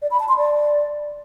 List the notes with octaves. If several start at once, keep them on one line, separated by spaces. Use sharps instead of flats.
D5
B5
A5
C6
D5